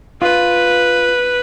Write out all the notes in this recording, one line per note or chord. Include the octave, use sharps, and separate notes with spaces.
F4 B4